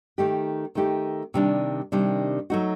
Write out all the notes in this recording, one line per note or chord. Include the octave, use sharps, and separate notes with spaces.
D#3 A3 D#4 G4
D#3 A3 D#4 G4
C3 D#3 G3 D4
C3 D#3 G3 D4
F#3 A3 D#4 F#4